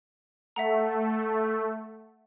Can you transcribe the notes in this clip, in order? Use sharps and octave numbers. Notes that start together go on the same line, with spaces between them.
A3 E5 F#5 A#5